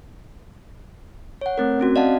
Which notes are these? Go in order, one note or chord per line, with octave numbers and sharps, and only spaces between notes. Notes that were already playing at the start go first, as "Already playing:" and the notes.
C#5 F#5
A3 C4 A#4
C4 C#4 F#4
D5 D#5 F5 F#5 A5